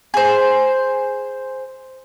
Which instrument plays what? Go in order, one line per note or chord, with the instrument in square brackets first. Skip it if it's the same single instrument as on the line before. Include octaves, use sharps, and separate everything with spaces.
[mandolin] G#4 C5